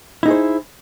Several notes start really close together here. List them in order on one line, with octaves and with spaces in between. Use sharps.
E4 D#4 G#4 C5